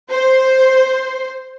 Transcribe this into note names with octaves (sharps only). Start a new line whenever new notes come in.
C5